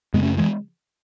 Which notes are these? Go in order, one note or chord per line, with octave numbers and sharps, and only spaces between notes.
F#2 C#3 G#3 B3
A3 C#4
E3 G#3